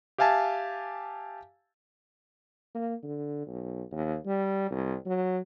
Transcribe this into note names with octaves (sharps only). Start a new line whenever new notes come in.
G4 E5 F5 G#5 A5
A#3
D3
B1
D#2
G3
C2
F#3